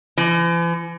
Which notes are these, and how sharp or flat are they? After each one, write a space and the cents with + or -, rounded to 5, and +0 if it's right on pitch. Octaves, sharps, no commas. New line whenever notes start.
E3 +45